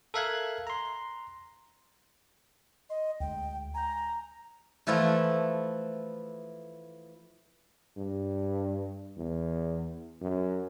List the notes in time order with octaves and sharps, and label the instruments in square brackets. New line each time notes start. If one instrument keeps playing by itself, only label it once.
[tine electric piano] A4 A#4 E5 F5 F#6 G#6
A#5 C6
[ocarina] D#5 [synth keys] C6
[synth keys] D2 G#3 [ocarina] G5
[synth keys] G#5 G6 [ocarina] A#5
[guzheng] E3 F3 A3 E4 F4
[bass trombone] G2
E2
F#2